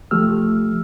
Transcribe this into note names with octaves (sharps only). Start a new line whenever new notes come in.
C2 F3 A3 G4 E6 F6